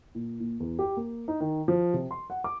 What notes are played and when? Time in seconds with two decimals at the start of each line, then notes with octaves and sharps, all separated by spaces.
0.15 A#2
0.40 A#2
0.60 E2
0.79 G4
0.97 A#3
1.28 D#4
1.40 D#3
1.68 F3
1.94 C3
2.11 C6
2.30 F#5
2.44 D6